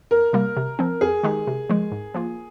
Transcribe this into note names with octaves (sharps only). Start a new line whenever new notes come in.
F2 A#4
C3 G3 A#3
C3
F3 C4
F2 G#4
D#3 G#3 D#4 G4
C3
F3 G#3
G#2
F3 A#3 F4